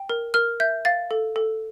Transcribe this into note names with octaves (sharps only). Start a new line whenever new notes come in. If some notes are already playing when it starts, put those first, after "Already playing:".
Already playing: G5
A#4
A#4 F6
E5 G6
F5 A6
A4
A4